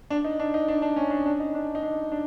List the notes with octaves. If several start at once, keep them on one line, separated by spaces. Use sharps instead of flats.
D4
D#4
D4
D#4
D4
D4
C#4
D4
D4
D#4
D4
D#4
D4
D4